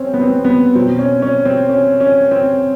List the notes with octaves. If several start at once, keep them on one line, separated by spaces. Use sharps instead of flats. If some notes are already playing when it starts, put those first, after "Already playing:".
Already playing: C4 C#4
B3
C4
B3
B3
B2 F#3 C4
C#4
C#4
C4
C#4
C#4
C4